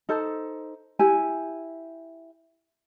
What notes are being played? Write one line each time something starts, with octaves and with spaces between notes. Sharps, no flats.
D#4 A4 C5
E4 G4 G#5